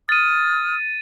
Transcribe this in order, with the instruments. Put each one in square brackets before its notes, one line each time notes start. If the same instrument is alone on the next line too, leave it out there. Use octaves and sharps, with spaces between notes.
[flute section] D#6 F6 [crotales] A6 D#7